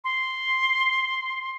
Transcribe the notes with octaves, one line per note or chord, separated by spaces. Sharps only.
C6